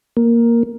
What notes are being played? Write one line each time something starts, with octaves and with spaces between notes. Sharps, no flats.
A#3